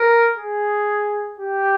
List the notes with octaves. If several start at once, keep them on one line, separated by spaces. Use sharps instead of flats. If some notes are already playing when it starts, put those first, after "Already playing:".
Already playing: A#4
G#4
G4